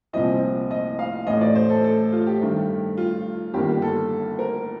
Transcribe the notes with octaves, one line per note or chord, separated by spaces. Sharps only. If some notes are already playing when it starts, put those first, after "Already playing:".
C2 A#2 F3 C4 D#5
D#5
F5
A1 A2 A3 D#5
D5
C5
A4
A4
F4
G4
G2 D#3 A3
F4
G1 G2 D#3 G3 A#3 G4
G4
A4
A#4